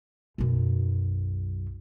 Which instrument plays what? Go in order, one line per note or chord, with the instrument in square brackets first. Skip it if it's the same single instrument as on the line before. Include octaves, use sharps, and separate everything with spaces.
[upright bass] B1 F#2